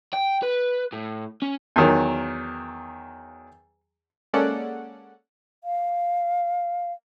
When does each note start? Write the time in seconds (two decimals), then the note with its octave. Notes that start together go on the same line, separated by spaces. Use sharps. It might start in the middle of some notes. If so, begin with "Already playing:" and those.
0.14 G5
0.43 B4
0.93 A2
1.42 C#4
1.76 E2 D#3 F#3
4.33 G#3 A#3 C#4 A4 D5 F#5
5.64 F5